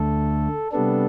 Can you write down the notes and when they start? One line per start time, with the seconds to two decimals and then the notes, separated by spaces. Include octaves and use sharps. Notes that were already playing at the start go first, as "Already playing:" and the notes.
Already playing: D2 D3 A3 A4
0.72 C3 G3 B3 D4 A4